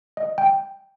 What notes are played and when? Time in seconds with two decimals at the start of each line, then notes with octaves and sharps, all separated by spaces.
0.17 D#5
0.38 G5